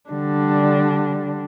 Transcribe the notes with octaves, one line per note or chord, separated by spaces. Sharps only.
D3 G3 D4